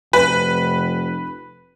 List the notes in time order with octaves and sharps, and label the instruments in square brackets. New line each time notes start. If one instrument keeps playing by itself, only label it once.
[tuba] F1 [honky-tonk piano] B4